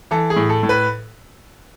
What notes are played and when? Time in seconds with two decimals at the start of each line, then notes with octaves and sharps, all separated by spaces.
0.11 E3 A4
0.30 G#4
0.36 A2
0.49 A4
0.63 A2
0.69 B4